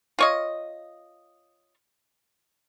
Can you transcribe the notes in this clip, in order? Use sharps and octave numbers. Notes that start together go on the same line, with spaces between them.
F4 C#5 D#5